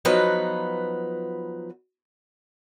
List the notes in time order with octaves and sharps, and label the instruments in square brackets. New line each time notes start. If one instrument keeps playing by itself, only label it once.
[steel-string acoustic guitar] F3 F#3 B3 D#4 B4 F#5